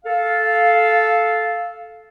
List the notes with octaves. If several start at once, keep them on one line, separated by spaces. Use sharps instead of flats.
A4 F5